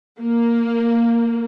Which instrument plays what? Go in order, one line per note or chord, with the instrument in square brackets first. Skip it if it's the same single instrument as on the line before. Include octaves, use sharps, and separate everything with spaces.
[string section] A#3